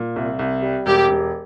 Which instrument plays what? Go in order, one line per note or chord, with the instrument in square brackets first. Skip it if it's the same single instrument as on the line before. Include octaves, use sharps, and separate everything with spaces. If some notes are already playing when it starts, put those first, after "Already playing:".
Already playing: [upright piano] A#2
C2
C2
G3
[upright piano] E1 [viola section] G4
[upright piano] E1